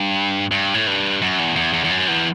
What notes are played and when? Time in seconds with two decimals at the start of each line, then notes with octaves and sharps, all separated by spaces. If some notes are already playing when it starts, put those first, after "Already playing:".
Already playing: G2
0.52 G2
0.74 A2
0.87 G2
1.22 F#2
1.39 E2
1.56 E2
1.73 E2
1.84 E2
1.91 F#2
2.08 E2